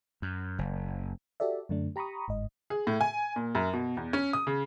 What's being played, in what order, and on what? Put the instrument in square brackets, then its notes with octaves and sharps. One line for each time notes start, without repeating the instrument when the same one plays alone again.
[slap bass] F#2
F#1
[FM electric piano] F#4 G4 A4 D5 E5
F#2 D3 A3 D4
G4 A#5 B5 C#6 D#6
G1 G#2 D#5
[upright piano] G#4
A2
G#5
A#2
F#2
B2
E2
C#4
D#6
C#3